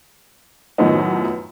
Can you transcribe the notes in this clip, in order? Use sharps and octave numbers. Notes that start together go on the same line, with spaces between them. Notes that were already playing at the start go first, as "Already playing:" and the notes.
F#2 A2 D#3 F3 B3 D#4